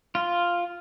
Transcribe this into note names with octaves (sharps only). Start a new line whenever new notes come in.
F4